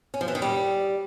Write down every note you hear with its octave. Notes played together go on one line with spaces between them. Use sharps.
C#4
F3
E3
D#3
G3